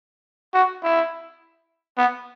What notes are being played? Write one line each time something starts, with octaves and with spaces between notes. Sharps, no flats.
F#4
E4
B3